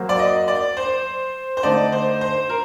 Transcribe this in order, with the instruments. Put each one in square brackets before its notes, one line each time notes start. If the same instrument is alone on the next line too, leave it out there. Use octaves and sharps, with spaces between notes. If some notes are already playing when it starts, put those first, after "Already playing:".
Already playing: [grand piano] F#3 A#3 F#4 C5
[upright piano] D5
D#5
D5
C5
C5
[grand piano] D3 A3 D#4 [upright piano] D5
[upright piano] C5
C5
A#4